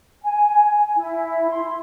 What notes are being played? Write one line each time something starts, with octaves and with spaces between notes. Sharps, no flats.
G#5
E4
C6